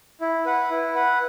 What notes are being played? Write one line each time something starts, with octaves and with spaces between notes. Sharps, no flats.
E4
B4 F#5
E4
B4 F#5